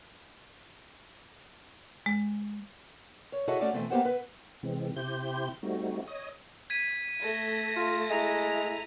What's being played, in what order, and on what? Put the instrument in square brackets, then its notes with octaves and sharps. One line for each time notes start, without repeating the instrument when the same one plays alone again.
[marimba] G#3
[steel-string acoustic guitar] C#5
E4 F#4 G#4 A4 C#5 D#5
A3 C#4 F#4 D5
B2 E3 A3 C4
A#3 B3 G4 C5 F#5
B4
[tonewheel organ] C3 E3 G#3 C4
C3 E4 G4 C5 G6
G3 A3 C4 D#4 F#4
C#5 D#5 D#6
[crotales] G#6 B6 D#7
[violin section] A3 A#6
[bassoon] F4
[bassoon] G#3 [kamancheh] E4 A#5